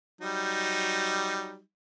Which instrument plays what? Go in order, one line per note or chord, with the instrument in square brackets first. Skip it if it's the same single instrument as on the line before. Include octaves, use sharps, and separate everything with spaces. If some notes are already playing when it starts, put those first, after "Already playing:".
[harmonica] F#3 G3 D#4